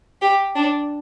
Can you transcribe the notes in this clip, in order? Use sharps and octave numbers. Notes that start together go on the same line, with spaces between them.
G4
D4